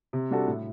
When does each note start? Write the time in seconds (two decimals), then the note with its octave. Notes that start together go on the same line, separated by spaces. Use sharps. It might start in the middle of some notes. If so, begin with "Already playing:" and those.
0.13 C3
0.31 G3 D4 F#4 A4
0.47 A2